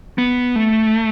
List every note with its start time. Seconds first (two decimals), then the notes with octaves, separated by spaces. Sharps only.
0.18 B3
0.56 A3